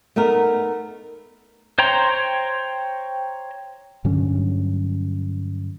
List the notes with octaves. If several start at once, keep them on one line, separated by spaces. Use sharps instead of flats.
A3 B3 D#4 A#4
C5 C#5 G5 A#5 C6
G2 D3 F#3 C#4